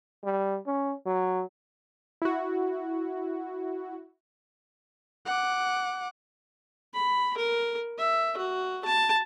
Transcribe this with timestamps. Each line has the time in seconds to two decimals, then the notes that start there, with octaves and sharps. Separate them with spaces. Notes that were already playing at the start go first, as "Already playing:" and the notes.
0.24 G3
0.67 C#4
1.06 F#3
2.22 E4 F#4
5.26 F#5 D6
6.94 B5
7.37 A#4
7.99 E5
8.37 F#4
8.85 A5